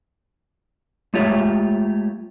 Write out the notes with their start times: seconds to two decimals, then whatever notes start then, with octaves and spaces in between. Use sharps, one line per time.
1.14 G#3 A3 F4 G4 C#5 E5